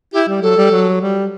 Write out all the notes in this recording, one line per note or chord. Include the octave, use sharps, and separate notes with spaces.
E4 G4
G3
F#3 A4
G3
F#3
G3